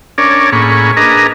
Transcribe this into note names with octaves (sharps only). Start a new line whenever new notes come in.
C#4 D4 A#4 C#5 D5
A2 A#3 C#4 G#4 B5 C#6
D4 G#4 A#4 B4 D#5 A#5